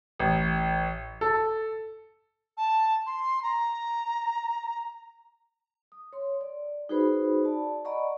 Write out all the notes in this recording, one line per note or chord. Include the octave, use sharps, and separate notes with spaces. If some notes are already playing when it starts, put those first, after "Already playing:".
A1
A4
A5
C6
A#5
D#6
C#5 C6
D5
D#4 F#4 G#4 B4 C5 B5
D5 A5
D5 D#5 F#5 A#5 B5 C#6